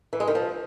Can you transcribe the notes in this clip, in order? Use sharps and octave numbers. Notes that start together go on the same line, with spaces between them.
E3
G#3
D#3
F3